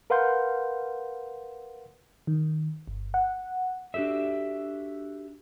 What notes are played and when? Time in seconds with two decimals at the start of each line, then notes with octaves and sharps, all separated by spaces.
0.10 A#4 B4 F5 F#5 C6 G6
2.27 D#3
2.88 G1
3.14 F#5
3.94 D4 F#4 G4 A4 E5